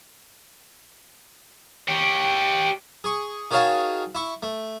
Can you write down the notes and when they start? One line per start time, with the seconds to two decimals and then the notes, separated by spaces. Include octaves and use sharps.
1.88 G4 C#5
3.04 G#4 C#6
3.51 D#3 F#4 G#4 C#5 F5 A5
4.15 E4 C#6
4.43 A3